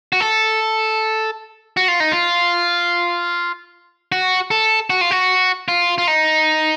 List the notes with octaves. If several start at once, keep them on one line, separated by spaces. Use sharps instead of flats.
F#4
A4
F#4
F4
D#4
F4
F#4
A4
F#4
F4
F#4
F4
F4
D#4